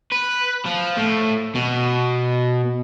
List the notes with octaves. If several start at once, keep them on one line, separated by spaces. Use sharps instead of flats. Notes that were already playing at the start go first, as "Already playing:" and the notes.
B4
F3
A2
B2